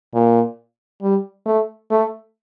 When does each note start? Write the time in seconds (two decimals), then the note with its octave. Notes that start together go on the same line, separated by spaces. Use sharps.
0.14 A#2
1.02 G3
1.46 A3
1.91 A3